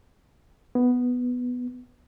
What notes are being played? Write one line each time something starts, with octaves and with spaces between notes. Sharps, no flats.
B3